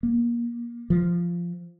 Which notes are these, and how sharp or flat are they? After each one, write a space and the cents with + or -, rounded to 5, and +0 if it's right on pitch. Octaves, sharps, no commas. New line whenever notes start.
A#3 +25
F3 -10